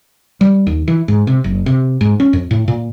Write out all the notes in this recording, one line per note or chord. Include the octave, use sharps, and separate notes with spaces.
G3
D#2
E3
G#2
C3
F#1
C3
G#2
C#4
F2
A2
A#2